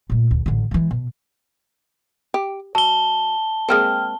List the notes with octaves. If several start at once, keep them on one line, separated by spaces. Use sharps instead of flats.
A#2 A3
D2
A1 D3
E3 G#3
B2
G4
F#3 A5 G7
G#3 A#3 C4 G5 F6